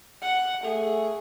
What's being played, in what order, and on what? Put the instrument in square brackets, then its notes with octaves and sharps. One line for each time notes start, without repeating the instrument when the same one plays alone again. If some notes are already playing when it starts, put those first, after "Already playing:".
[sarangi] F#5
[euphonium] A3 [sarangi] G#4